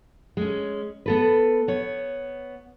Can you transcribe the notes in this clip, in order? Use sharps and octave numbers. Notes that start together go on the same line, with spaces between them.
G#3 C#4
B3 A4 B4
B3 C#5